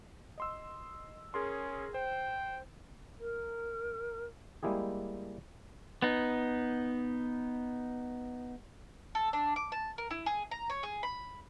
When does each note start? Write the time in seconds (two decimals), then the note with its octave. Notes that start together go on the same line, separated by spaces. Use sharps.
0.38 D#5 C6 E6
1.34 C#4 G#4 A#4 C6
1.94 C5 G5
3.19 A#4
4.63 G3 G#3 A#3 E4 G4 G#4
6.02 B3 D#4
9.15 A4
9.33 D4
9.56 D6
9.72 A5
9.98 A#4
10.11 E4
10.26 G#4
10.51 A#5
10.70 C#5
10.83 G#4
11.03 B5